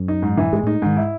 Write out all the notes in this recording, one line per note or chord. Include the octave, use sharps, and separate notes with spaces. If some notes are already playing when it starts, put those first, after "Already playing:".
Already playing: F#2
D#4
G#2
E3
G#2 G#3
A2 D#4
G#2 D#3
E4